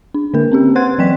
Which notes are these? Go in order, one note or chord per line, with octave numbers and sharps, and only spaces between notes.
D4
D3 A#3 D4 A#4
C4 C#4 G4
B4 C5 F#5 C6 F#6 G#6
E3 F#3 D5 G5 B6